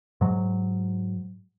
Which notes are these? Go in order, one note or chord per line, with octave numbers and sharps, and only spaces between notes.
G#2 F#3